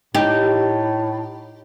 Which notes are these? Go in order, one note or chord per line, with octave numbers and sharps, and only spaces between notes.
A2 D#4 G4